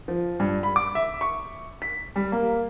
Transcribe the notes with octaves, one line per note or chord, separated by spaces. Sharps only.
F3
G2
B5
D6
E5
C#6
B6
G3
A#3